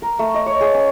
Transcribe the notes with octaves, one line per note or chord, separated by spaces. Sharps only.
A#4
A3
D#5
C#5
G#4
C#4